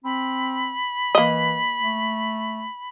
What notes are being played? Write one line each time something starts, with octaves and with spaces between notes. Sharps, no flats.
C4 B5
E3 A#3 D#5
A3